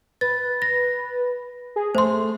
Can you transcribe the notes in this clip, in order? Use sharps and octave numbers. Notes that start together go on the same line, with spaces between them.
B4 A6
A#6
G#4
A3 C5 C6